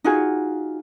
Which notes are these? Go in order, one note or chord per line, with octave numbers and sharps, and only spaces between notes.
D#4 F4 F#4 G#4